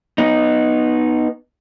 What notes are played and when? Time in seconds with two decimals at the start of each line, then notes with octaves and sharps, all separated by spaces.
0.18 B3 D#4